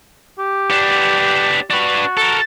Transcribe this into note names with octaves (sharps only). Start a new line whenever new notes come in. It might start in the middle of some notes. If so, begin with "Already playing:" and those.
G4
B3 D4
D4 F#4 B4
A4 A#4